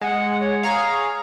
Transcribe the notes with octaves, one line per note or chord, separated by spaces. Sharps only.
G#3 F#5
C#5
G#4 C#5 F5 A#5